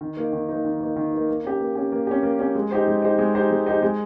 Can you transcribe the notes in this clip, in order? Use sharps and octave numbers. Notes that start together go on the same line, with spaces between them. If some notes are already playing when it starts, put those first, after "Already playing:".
D#3
A#3 D#4
D#3
A#3 D#4
D#3
A#3 D#4
D#3
A#3 D#4
A#3
C#4 G4
A#3
C#4 G4
A#3
C#4 G4
A#3
C#4 G4
G#3
D#4 G4 C5
G#3
D#4 G4 C5
G#3
D#4 G4 C5
G#3
D#4 G4 C5
G#3